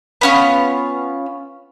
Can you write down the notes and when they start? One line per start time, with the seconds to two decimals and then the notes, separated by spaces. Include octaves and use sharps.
0.21 B3 C#4 F4